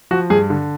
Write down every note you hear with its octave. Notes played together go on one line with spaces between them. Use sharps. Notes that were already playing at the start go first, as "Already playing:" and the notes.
F3 F#4
G2 G#4
D3